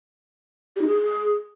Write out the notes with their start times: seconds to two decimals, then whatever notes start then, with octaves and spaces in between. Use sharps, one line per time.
0.76 G4
0.82 D#4
0.87 G#4